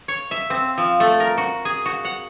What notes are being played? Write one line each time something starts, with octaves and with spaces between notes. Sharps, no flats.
C#5
E5
C4
F3
A3
A#4
F#4
G#4
F#4
F#5